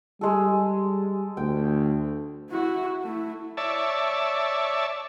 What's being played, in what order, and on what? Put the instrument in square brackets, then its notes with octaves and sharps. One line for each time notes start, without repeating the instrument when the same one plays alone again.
[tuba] G3 [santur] G#3 A4
[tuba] D2 [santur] G5
[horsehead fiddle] E4 F#4
A3 E4
[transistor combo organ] C#5 D5 E5 A5